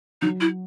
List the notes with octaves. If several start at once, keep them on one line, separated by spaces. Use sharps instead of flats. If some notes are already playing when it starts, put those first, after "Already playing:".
F#3 D#4
E4